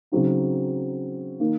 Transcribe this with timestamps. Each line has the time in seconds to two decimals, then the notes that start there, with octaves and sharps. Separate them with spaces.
0.12 C#3 F#3 C4 D#4
1.40 D#3 A#3 D#4